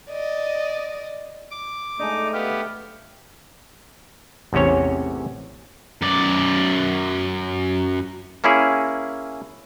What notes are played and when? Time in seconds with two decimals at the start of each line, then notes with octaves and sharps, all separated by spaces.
0.11 D5 D#5
1.51 D6
2.00 G#3 A3 D4 D#4
2.33 B3 G4 F5
4.53 A1 E2 C3 C#4 C#5
6.02 F#2 D5
8.44 A#3 C#4 E4 G#4